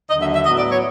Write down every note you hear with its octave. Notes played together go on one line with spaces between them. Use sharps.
D#2 D3 F#3 D#5
E5
E5
A2 F#3 B3 D#5
D5
C#5